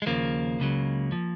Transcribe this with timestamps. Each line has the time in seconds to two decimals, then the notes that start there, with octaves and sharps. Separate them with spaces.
0.02 G#3
0.06 D#2 C#3 F3 A#3
0.60 C#2 C#3 F#3
1.12 F3